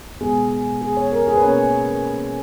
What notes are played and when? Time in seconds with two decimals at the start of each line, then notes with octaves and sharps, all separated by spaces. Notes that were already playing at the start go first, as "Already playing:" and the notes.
0.21 B2 G#3 B3 G#4
0.82 G#4
0.97 C#5
1.12 A#4
1.27 G#4
1.36 B4
1.42 B2 A#3 C#4 C#5